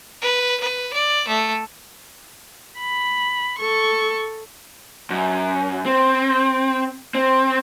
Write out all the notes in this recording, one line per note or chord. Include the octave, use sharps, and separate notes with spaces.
B4
B4
D5
A3
B5
A4 C#6
F#2
C4
C4